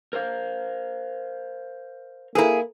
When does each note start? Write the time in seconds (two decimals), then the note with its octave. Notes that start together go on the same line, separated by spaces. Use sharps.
0.13 A#4 C5 F5
2.35 A#3 E4 G#4 A4 B4 A#5